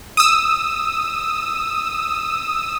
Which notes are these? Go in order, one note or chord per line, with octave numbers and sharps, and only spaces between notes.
D#6 E6